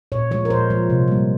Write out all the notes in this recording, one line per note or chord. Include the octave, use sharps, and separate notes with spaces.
A#2 C#5
F3 G#3 C#5
A#4
A#2 C5
F3 G#3
C3
G3 A#3